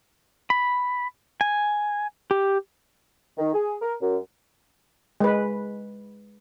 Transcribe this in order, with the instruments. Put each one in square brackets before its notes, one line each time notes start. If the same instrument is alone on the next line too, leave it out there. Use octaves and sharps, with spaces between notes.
[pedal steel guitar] B5
G#5
G4
[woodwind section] D#3
G#4
A#4
F#2
[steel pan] G#3 B4